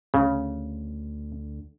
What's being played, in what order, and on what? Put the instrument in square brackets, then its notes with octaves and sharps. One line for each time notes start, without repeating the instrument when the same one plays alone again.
[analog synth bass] D2 [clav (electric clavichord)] C#3